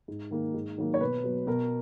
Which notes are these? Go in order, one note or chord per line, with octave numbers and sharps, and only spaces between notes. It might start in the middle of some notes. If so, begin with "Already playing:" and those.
G#2
D#3 A#3
G#2
D#3 F#3 A#3
C#5
B2 B4
F#3 B3
B2 A#4